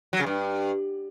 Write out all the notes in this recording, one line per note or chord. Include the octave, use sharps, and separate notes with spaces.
F#3
C#3
G2